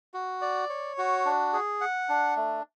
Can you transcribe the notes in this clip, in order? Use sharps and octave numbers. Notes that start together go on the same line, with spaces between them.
F#4
D5
C#5
F#4
D4
G#4
F#5
D4
A3